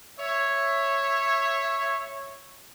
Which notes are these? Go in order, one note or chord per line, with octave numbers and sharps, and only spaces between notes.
C#5 E5